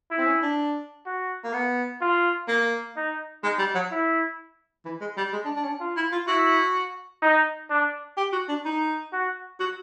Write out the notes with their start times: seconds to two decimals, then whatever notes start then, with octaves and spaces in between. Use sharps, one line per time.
0.11 E4
0.18 C4
0.27 C#4
0.42 D4
1.05 F#4
1.44 A#3
1.53 B3
2.01 F4
2.48 A#3
2.96 D#4
3.43 G#3 D#4
3.59 G3
3.75 F#3
3.91 E4
4.85 E3
5.01 G#3
5.17 G3
5.33 G#3
5.45 D4
5.56 D4
5.64 C#4
5.68 D4
5.80 F4
5.96 E4
6.12 F4
6.27 E4 F#4
7.22 D#4
7.70 D4
8.17 G4
8.33 F#4
8.49 D4
8.65 D#4
9.13 F#4
9.60 F#4